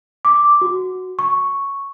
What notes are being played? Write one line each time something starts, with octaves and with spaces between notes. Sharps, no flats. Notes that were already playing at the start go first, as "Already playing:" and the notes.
D6
F#4
C#6